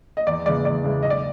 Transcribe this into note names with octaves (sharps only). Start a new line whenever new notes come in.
D#5
E2 D5
C#3 E3 G#3 D5
E2 D5
C#3 E3 G#3
B1 D#5
D5